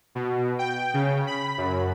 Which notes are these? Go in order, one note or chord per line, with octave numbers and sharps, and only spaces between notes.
B2
G5
C#3
B5
F#2